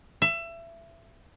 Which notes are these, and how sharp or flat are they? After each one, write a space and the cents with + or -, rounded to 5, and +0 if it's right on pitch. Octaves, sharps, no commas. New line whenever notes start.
E5 +25